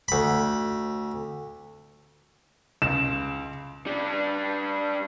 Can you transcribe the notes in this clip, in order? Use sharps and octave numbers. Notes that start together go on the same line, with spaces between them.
D2 B5
C#2 E7
G3 D4